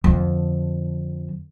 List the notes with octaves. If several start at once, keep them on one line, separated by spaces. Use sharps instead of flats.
F2 D3